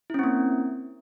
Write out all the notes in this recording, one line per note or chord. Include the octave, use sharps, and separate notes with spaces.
A#3 C4 C#4 E4